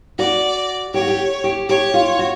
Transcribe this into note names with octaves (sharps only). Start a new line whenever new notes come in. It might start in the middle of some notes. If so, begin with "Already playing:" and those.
F#4 D5
G4 C#5
F#4
G4
G4
G4 C#5
F4
F#4